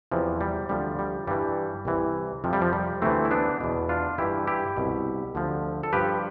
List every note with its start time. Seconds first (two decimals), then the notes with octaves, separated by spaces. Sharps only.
0.12 E2 C3 E3 F3
0.41 G3
0.69 D2 C3 F3 G3
0.99 G3
1.27 G2 E3 G3
1.85 C2 C3 E3
2.44 F2 C3 F3
2.53 G3
2.62 F3
2.73 G3
3.02 D2 C3 E3 A3 C4
3.25 E4
3.31 B3 D4
3.60 E2 B2
3.89 D4 F4
4.18 G2 E3 E4 G4
4.47 E4 G4
4.77 C2 B2
5.35 D2 D3 F3
5.83 A4
5.93 G2 F3 G4 B4